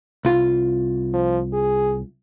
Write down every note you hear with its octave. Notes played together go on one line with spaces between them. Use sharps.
C2 F4
F3
G#4